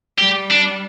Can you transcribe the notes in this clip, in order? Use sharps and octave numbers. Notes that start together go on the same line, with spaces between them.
G3 G4
D4